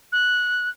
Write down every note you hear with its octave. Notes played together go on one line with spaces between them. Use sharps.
F#6